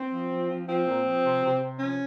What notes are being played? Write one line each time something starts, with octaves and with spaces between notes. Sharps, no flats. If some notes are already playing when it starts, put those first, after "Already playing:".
Already playing: C4
F3
F3
F3
F3 C4
A#2
F3
C3
C3
C3
F3 C#4